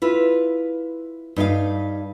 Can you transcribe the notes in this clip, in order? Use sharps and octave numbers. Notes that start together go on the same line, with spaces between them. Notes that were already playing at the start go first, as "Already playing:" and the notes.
E4 F4 B4
G2 D#4 A#4 F5